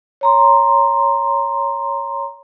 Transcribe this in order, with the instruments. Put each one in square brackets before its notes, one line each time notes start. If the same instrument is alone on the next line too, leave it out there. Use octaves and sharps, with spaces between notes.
[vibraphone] C#5 A#5 C6